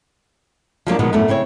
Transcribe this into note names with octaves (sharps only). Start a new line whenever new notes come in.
F3 F#3 A#3 D4
B2 D#3 F3 F#3 G#3
F#2 A2 A3 B3 D4
C#3 C4 E4 C#5